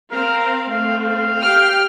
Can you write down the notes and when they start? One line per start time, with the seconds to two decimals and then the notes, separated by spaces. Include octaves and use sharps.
0.12 C4 A#4 F5
0.68 A3 C4 F5
1.02 F5
1.40 G4 G5 F6